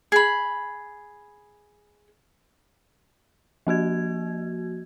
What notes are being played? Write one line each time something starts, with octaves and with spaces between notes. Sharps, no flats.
G#4 B5
F3 A#3 F#4 G#6